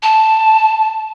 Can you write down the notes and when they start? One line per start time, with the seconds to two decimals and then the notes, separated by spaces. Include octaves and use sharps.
0.03 A5